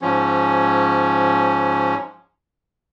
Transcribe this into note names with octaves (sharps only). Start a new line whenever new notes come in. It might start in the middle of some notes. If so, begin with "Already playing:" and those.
G#2 F3 C#4